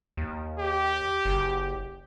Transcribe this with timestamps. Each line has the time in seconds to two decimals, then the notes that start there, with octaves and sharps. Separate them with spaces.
0.17 D#2
0.59 G4
1.25 F#1